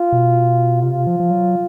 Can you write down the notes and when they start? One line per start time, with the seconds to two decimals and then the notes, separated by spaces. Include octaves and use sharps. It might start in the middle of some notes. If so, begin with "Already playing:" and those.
Already playing: F4
0.12 B2
0.83 C3 F4
1.07 F3
1.20 F3
1.31 F#3